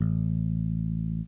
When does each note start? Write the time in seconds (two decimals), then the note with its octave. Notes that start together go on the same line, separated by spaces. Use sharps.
0.01 A1